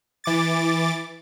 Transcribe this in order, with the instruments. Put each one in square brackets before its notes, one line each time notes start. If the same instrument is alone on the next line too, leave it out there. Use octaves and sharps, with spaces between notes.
[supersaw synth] E3 D6 A6